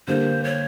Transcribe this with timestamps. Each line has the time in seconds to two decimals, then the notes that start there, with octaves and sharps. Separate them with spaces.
0.07 D3 G3 A#3 C5
0.44 C#5